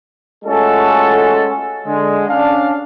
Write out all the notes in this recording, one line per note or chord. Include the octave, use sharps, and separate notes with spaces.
G#3 A3 C#4 F4 F#4 A4
D3 G#3
C#4 D4 F5